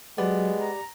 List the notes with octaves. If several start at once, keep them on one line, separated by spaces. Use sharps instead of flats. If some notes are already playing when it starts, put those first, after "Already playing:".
F#3 G#3 B3 G4 D5
A#5